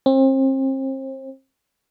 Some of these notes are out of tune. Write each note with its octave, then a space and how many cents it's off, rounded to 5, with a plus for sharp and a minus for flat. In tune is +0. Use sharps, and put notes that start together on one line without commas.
C4 +35